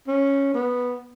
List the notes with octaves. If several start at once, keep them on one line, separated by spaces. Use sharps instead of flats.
C#4
B3